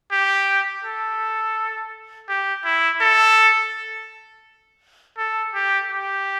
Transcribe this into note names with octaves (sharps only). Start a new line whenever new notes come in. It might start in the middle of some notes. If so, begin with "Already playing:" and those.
G4
A4
G4
E4
A4
A4
G4
G4